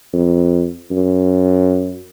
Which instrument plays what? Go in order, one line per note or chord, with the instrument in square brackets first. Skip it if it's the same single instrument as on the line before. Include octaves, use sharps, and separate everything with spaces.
[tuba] F2
F#2